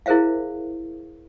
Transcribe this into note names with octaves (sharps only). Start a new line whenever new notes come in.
E4 G#4 A#4 C5 E5 F5